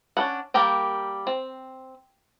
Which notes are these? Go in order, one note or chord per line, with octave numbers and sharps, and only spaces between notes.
C#4 D4 E4 F#5
G3 A#3 G4 A#4 G5
C4